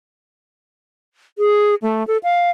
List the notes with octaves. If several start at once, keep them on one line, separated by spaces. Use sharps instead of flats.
G#4
A3
A4
F5